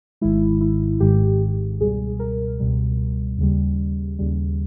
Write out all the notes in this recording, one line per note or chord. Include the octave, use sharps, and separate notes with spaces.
G#1 G#2 D#3 G#3 E4
E4
G#1 G#2 D#3 G#3 G4
C#2 B2 G3 G#4
A#4
C#2 B2 G3
D#2 C#3 G3
D#2 C#3 G3